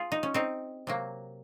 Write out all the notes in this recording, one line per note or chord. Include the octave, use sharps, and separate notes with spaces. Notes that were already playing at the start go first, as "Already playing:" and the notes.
Already playing: F4 G#4
D#4
C#4
C4 D#4
C3 F#3 A#3